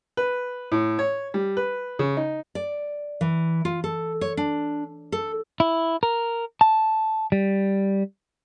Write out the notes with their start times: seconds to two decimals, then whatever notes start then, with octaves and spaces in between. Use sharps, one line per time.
0.17 B4
0.72 A2
0.99 C#5
1.34 G3
1.57 B4
1.99 C#3
2.17 D#4
2.55 D5
3.21 E3
3.65 F4
3.84 A4
4.21 C#5
4.37 D4
5.12 A4
5.60 E4
6.03 A#4
6.61 A5
7.32 G3